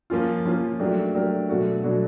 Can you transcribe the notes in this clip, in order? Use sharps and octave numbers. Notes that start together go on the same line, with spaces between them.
F3 A#3 C#4 F4
F3 A#3 C#4 F4
F#3 A3 D4 G4 A#4
F#3 A3 D4 G4 A#4
B2 F#3 A3 D4 F#4
B2 F#3 A3 D4 F#4